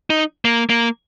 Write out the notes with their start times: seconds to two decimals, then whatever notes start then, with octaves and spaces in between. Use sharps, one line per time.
0.10 D#4
0.45 A#3
0.70 A#3